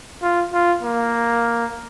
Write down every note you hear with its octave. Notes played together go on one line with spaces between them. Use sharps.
F4
F4
A#3